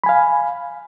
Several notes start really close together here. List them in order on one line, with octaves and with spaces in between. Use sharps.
B5 G#5 F5